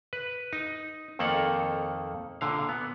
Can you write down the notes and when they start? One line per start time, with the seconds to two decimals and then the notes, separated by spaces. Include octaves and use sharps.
0.13 B4
0.53 D#4
1.19 F2 D#3 A#3 A4 F#5
2.41 A#2 D3 F5
2.69 B3